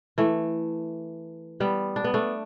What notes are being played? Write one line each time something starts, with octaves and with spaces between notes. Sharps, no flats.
E3 A3
G3 B3
D4
B3
A3 D4